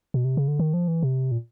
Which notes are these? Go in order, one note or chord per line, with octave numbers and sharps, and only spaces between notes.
B2
C3
C#3
D3
D#3
F3
E3
C3
A#2